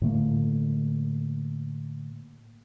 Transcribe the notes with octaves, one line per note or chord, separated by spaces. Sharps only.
A2 D3 A3 A#3